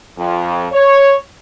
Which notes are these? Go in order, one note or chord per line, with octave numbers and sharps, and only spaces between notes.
F2
C#5